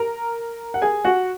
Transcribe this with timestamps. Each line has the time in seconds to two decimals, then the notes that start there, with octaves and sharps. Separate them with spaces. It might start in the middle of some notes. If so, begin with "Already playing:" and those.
Already playing: A#4 A#5
0.74 F#5
0.82 G#4 G#5
1.05 F#4 F#5